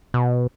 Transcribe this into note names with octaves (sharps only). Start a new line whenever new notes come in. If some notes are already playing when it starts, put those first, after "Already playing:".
B2